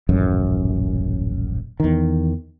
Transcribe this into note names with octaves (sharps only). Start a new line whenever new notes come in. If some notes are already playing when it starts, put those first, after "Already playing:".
D#1 A1 F#2
E2 D#3